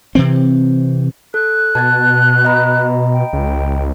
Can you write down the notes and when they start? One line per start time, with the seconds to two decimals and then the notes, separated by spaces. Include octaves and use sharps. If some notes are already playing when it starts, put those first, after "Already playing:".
0.15 C3 E3 C4
1.34 A4 F#6
1.75 B2 A5 G#6 A6
2.45 D#5 A#5 B5
3.12 G5
3.33 C#2